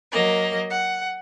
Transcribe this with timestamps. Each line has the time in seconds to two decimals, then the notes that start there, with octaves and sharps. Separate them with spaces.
0.11 F#3 A#3 D#5
0.70 F#5